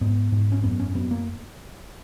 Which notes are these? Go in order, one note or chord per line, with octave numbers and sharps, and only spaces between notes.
G#2 B3
G#2
C#4
F#2 B3
C#4
F#2 B3
A#3